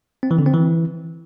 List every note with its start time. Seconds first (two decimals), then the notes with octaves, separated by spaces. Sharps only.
0.23 C4
0.31 E3
0.39 D3
0.46 C4
0.54 E3